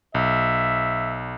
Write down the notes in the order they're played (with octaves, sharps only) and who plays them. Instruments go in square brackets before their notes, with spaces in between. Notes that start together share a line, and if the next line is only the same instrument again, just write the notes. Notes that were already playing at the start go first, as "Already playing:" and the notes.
[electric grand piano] B1 [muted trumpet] E5